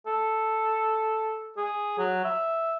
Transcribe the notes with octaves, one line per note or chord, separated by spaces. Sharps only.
A4
G#4
F#3
E5